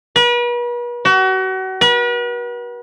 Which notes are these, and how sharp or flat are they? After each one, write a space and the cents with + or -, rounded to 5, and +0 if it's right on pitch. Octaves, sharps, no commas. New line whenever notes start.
B4 -40
F#4 +35
B4 -40